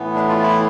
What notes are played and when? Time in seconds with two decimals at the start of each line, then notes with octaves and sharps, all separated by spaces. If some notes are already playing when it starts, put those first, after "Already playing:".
Already playing: A2 E3 B3
0.15 D4
0.29 F4
0.43 E4